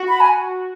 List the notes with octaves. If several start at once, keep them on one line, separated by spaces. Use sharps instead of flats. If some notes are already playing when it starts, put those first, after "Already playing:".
Already playing: F#4
B5
G#5